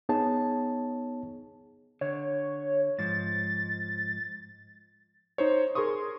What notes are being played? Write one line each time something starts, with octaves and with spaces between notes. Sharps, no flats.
B3 D#4 G#4 C#5 A5
D3 C#5
G#2 F3 A6
D#4 C5 C#5
G#4 A#4 C6 C#6 D#6